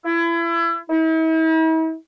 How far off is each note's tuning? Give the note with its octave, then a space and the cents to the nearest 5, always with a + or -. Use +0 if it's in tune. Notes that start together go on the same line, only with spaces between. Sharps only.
E4 +30
E4 -45